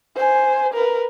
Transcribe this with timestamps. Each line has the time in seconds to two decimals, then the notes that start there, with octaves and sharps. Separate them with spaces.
0.15 C5 G#5
0.73 A#4 B4